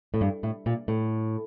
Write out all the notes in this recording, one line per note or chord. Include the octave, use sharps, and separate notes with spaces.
A2
G2
A2
A#2
A2